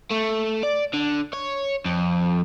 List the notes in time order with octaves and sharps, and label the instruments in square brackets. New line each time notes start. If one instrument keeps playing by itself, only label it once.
[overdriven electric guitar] A3
D5
D3
C#5
F2